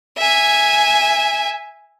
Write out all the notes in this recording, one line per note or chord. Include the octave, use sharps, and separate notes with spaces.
E5 G#5